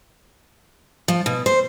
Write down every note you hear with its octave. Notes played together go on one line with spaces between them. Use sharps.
F3
B2
C5